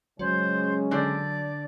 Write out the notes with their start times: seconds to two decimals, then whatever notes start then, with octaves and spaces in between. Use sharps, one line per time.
0.19 C#3 F#3 G#3 C#4 C5
0.91 D3 D4 C5 D5